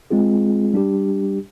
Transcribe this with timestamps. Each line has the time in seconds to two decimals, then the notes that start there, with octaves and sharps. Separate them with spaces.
0.10 G#3 C4 F4 G#4
0.74 G3 D4 G4